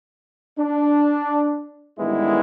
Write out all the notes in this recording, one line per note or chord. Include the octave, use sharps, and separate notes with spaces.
D4
A1 G2 D#3 G#3 B3 E4